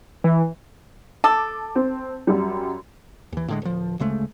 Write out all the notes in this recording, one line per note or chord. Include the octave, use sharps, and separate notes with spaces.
E3
A4 D6
C4
F#2 G3
D#2 E3
A2 D3 G#3
D1 F3
D2 C#3 G#3 A3